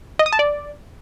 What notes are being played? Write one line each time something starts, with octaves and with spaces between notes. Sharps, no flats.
D#5
D#6
A5
D5